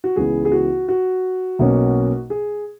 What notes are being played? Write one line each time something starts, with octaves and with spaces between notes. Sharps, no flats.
F#4
C#2 C#3 E3 B3 G#4
G#4
F#4
F#4
B1 B2 A#3 C#4
G#4